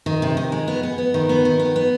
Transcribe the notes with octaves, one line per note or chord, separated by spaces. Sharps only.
D#3
C3
D#3
G#3
B3
B3
B3
D#3
B3
D#3
B3
B3